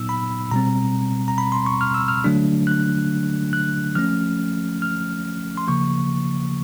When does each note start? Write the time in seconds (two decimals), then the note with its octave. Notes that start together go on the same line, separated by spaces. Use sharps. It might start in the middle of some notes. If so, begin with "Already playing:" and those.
Already playing: A#2 F#3 B3 D#4 E6
0.09 B5
0.51 B2 G3 C4 A#5
1.28 A#5
1.38 B5
1.52 C6
1.66 C#6
1.81 F6
1.94 E6
2.08 F6
2.24 D3 F#3 A3 D4
2.67 F#6
3.53 F#6
3.95 F3 A3 C#4 F6
4.82 F6
5.57 C6
5.68 C#3 F3 A#3 C#6